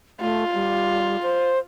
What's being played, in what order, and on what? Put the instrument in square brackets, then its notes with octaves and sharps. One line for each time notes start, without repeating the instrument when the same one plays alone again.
[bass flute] A3 [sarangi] F4
[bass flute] G3
C5